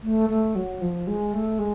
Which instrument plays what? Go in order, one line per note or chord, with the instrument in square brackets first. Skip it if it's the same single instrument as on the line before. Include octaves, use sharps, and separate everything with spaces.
[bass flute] A3
A3
F#3
F3
G#3
A3
G#3